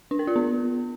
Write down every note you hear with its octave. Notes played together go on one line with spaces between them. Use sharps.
D4
A#4
F4
B3